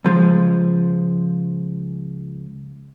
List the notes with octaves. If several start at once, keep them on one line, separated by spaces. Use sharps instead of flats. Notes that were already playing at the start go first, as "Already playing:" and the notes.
C#2 F3 G#3